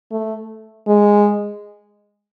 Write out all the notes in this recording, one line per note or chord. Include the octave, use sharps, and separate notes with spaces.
A3
G#3